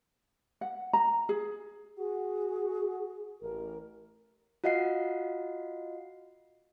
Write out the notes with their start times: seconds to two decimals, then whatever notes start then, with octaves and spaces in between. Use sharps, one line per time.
0.61 F#5
0.93 A#5
1.29 G#4
1.98 F#4 G#4
3.41 A1 A#4
4.64 F4 F#4 D#5 F5 F#5 C7